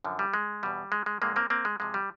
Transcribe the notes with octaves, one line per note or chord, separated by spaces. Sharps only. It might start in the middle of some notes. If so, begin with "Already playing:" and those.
F#2 D3 F3
G3
G#3
E2 B2 G3
G#3
G#3
G2 D3 F3 G#3 A#3
A#3 C4
A#3 C4
G#3
F2 C3 F3 G#3
G3